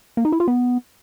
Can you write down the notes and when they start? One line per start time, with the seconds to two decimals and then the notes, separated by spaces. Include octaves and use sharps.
0.17 A#3
0.25 D#4
0.32 E4
0.40 F4
0.48 B3